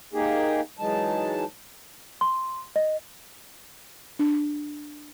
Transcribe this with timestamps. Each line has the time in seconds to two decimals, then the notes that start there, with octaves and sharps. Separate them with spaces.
0.13 A#3 D#4 G4 G#4
0.79 E3 F#3 G#3 D#4 A5
2.21 C6
2.76 D#5
4.19 D4